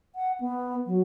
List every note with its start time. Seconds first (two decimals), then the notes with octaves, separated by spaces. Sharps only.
0.15 F#5
0.40 B3
0.86 F#3